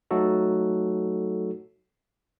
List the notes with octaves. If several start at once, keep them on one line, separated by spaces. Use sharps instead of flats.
F#3 A3 D#4 F#4 A4